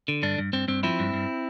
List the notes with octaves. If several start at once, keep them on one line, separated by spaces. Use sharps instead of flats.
D3
G2 D4
G2
G2 C4
G2 C4
F3 C4 E4
G2
G2